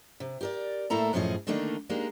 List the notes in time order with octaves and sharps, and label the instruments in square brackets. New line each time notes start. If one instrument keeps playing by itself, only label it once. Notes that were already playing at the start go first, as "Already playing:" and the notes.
[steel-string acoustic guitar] C3
G4 A#4 D5
A2 A3 A#3 E4 A4 A#5
F#2 A2 F3 C#4 G#4 D#5
D3 D#3 A3 A#3 D4 D#4
G#3 A#3 D4 D#4 G4